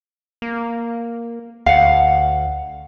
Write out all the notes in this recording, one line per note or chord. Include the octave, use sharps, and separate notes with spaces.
A#3
D2 F5 F#5